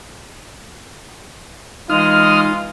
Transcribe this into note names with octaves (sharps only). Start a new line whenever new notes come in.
E3 G#3 D#4 F4 D#6 F6